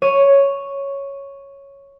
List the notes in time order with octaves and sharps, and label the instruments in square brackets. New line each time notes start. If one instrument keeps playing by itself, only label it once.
[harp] C#5 D#7